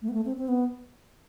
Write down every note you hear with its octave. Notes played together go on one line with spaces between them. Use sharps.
A3
B3
A3
C4
C4
B3